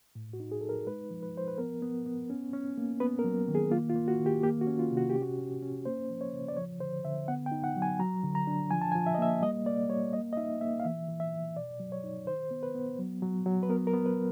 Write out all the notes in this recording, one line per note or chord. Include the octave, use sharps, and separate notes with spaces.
A2
F#4
D#4
G#4
D#4 A4
A#4
G#3 B4
F3
B4
F3 C5
B4
B3 A#4
B3
B3
C#4
C#4
A#3
B3 B4
A#4
F#3
D#3
G#4
A#3 F4
F4
A#3
F#4
D#3
G4
A#3 G4
F#4
C#4
F4
C3
F#4
G4
C#4
F#4
C#4
C#4
A#3 C5
F3
C#5
C#3
D5
F3 C#5
D3 C5
D3 E5
B3 F#5
G5
D#4
F#5
F#3
G#5
F#3 A#5
D3
A#5
D4
F3 G#5
A5
G#5
F3
E5
D#5
A#3 E5
G3 D#5
A#3 D5
G3 C#5
A#3 D#5
D#5
D#4 E5
A#3 E5
F5
E3 E5
E3
E5
E3
B2 D5
F#3
C#5
D#4
D#3 C5
B3
B4
B3
F#3
F#3
F#3
B4
B3 A#4
A#4
B3
B4